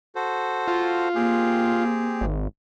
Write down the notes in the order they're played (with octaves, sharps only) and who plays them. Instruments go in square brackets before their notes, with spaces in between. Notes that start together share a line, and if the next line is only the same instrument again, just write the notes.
[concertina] F#4 A4 C5
[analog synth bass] F4
[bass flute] A#3 [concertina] C4 G4 G#4
[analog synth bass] G#1